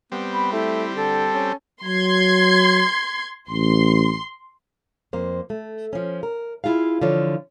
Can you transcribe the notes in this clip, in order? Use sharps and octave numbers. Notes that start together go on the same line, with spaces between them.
G3 B3 C4
B5
A3 E4
D3 A4
C#4
F#3 C6 G#6
A1 C6
F2 A#3 C5
A3
F3 C#4
A#4
E4 F4 G#4 F5
D3 E3 F3 F4 C#5